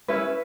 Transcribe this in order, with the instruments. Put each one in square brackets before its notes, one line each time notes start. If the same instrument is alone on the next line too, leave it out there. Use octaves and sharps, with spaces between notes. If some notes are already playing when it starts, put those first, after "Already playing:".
[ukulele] C#4 E4 B4